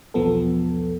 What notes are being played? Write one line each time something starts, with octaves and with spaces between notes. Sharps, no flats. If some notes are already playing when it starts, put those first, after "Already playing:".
B1 E2 F3 B3 A4